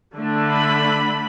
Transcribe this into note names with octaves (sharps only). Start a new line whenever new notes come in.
D3 A3 D4
B5